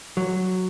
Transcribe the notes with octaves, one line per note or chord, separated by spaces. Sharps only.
F#3